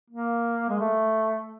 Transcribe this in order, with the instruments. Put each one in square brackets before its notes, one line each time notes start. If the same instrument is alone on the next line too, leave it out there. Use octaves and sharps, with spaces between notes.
[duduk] A#3
G#3
A3